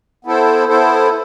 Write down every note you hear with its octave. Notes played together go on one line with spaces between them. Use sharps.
B3 E4 A4 C5
B3 E4 A4 C5